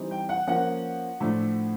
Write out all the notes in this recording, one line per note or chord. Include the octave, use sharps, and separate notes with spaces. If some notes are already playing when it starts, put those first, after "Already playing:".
Already playing: E3 G3 C4 D#4
G5
F#5
F3 A#3 C#4 F#5
A2 F3 A3 D4